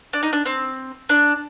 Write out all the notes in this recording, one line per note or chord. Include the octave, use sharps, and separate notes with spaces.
D4
D#4
D4
C4
D4